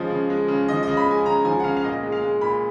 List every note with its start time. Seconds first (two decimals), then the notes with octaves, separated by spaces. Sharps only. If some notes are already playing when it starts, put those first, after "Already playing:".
Already playing: C#3 F3 G#3 D#5
0.10 C#3
0.30 G#3
0.48 C#3
0.68 F3 D#5
0.83 C#3 D#5
0.97 B5
1.06 G#3 G#5
1.25 C#3 A#5
1.44 F3 G#5
1.60 F#5
1.64 C#3 F5
1.77 F5
1.84 A#2 D#5
2.03 G#3
2.12 F5
2.22 G#3
2.41 A#2 B5